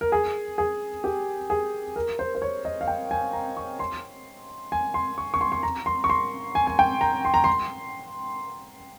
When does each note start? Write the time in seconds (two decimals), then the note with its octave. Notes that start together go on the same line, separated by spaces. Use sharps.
0.01 A#4
0.12 G#4
0.58 G#4
1.04 G4
1.50 G#4
1.96 A#4
2.19 C5
2.35 C5
2.42 C#5
2.65 D#5
2.81 F5
2.88 G5
3.11 G#5
3.33 A#5
3.57 C#6
3.79 C6
4.72 G#5
4.94 C6
5.18 C#6
5.34 C#6
5.41 C6
5.52 C6
5.63 A#5
5.86 C6
6.04 C#6
6.10 C6
6.55 G#5
6.67 G#5
6.79 G5
7.01 A#5
7.25 C6
7.34 A#5
7.44 C6